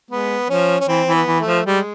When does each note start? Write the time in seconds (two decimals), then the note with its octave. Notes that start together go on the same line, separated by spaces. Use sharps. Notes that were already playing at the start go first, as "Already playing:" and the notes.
0.11 G#3 B3
0.49 F3 C#4
0.80 C#4
0.88 E3 C4
1.08 E3
1.14 B3
1.27 E3
1.40 A3
1.46 F3
1.66 G3 G#3